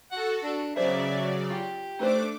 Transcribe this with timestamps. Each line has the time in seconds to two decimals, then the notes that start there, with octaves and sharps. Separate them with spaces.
0.12 F#4 A4 F#5
0.43 D4
0.76 C#3 F#3 B3 G#4 C5 D5 E5
1.50 F4 G4
1.99 A3 D4 D#4 B4 C5 D6